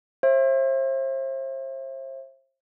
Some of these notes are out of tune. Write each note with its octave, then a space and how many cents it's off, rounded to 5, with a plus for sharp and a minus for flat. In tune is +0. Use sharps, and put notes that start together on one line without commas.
C5 +35 E5 +15